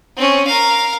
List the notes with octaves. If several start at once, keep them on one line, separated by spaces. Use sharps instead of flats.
C4 C#4
A#4 F5